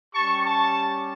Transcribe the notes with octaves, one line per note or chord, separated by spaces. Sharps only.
G3 C#4 G4 A5 C#6
A5 C#6